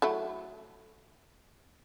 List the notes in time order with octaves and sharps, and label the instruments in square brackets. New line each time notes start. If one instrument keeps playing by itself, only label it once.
[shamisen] F#3 A3 E4